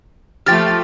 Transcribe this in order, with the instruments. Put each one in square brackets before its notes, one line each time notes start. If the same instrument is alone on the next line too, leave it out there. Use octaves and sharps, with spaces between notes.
[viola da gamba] F3 A3 [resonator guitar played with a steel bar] G4 G5 [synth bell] F6 A6